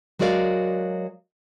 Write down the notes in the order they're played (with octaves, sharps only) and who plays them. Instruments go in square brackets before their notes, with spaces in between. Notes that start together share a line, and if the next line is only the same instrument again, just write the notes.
[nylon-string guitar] F#3 G#3 F#4 A#4 D5 F5